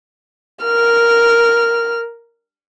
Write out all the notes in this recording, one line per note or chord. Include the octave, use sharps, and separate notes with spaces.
A#4 F6